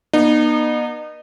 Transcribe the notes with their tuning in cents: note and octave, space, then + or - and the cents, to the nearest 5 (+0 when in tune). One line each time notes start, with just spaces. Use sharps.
B3 -45 D#4 -35